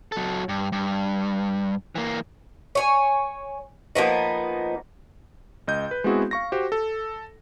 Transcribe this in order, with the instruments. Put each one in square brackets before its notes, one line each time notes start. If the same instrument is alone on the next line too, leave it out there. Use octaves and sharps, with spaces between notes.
[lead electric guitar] F#3 A4
G2
G2
E3 A#3
[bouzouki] C#5 G#5
F3 A#3 B3 D#4
[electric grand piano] C#2 D#5 G6
B4
G#3 B3 C4 E4 F#4 G#4
F5 C#6 A#6
F#4 G4 C5
A4